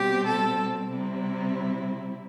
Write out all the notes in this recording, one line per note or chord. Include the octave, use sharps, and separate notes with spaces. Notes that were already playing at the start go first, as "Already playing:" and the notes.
Already playing: B2 G3 C4 G4
A4
C3 G3 C4 E4